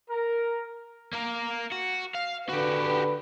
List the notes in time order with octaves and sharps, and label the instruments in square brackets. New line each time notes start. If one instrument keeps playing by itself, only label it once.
[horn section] A#4
[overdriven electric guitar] A#3 A#4
F#4
F5
[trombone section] D3 B4 [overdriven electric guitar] F#4 G4